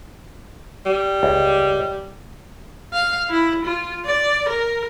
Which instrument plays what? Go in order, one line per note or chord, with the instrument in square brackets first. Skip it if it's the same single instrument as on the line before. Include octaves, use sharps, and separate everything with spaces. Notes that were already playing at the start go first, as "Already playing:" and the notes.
[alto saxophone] G3
[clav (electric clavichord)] C#2
[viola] F5
E4
F4
D5
A#4